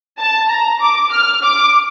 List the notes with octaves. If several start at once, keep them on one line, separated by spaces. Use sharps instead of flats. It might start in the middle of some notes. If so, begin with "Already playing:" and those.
A5
A#5
D6
F6
D6